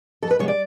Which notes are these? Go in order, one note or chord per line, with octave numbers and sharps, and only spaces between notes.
F2 A4
B4
C3 F3 G#3 B3 C#5
D5